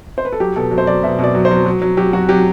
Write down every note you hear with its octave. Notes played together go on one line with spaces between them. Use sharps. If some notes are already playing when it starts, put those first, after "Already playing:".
C5
B4
A4
F#3 G4
B2 A4
F#3
C5
F#3 D5
B2 E5
B2 D5
F#3
C5
F#3
F#3
F#3
F#3 G4
F#3 F#4
F#3 G4